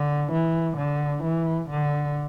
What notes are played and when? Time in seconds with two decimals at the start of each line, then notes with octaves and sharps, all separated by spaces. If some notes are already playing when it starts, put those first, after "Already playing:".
Already playing: D3
0.32 E3
0.78 D3
1.24 E3
1.70 D3